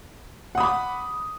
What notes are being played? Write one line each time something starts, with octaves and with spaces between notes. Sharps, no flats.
F#5 B5 D6 D#6